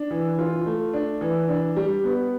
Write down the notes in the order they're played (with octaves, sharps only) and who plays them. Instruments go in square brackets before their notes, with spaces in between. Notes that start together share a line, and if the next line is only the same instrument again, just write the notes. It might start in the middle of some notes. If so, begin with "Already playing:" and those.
Already playing: [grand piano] D4
E3
F4
A3
D4
E3
D4
G3
B3